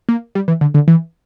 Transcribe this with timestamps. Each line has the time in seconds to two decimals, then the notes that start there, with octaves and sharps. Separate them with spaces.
0.09 A#3
0.35 G3
0.48 E3
0.61 D3
0.74 D3
0.88 E3